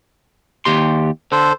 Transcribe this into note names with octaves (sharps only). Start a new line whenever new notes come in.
D#2 G4 C6
D3 A4 C5